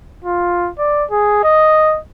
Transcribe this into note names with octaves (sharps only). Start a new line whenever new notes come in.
F4
D5
G#4
D#5